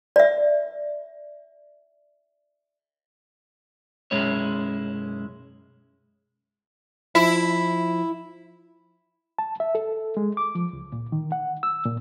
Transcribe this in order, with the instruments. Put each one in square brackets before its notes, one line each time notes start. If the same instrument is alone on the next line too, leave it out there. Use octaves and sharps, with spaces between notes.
[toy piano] D5 E5
[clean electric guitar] B1 F#2 G#3 C#4 E4 C#5
[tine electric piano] F3 B6 [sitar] E4
[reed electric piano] A5
E5
A4
G#3
D6
F3
C#2
A#2
D#3
F#5
E6
A#2